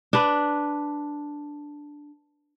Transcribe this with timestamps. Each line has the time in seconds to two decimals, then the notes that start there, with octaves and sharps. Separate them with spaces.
0.13 D4 B4